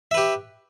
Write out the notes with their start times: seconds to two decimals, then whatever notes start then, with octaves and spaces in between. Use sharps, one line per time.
0.11 E5
0.14 B4
0.17 G4